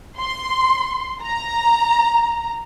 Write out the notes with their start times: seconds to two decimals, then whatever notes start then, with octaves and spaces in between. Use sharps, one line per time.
0.18 C6
1.22 A#5